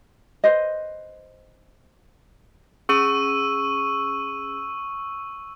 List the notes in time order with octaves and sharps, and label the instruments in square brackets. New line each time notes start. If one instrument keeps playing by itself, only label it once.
[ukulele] B4 C5 D#5
[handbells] C#4 G#4 [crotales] C#6 E6 D#7